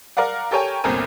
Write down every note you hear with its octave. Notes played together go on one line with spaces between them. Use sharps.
A#4 D5 F5 F#5
G4 A4 A#4 C#5 G5 G#5
G1 C2 A#2 C4 A#4 G#5